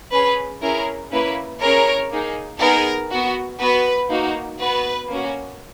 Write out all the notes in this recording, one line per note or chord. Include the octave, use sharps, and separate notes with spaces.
C#4 G#4 B4
C#4 E4 G#4 A#4
A#3 C#4 E4 B4
C#4 E4 G#4 A#4 C#5
A#3 D#4 G#4
B3 D#4 G#4 A#4
B3 F#4
B3 F#4 B4
A#3 D#4 F#4
B3 F#4 B4
A#3 C#4 F#4